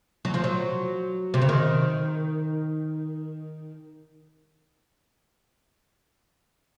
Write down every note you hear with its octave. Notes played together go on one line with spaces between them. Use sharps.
F#3
F3
F#3
C3
C#3
D#3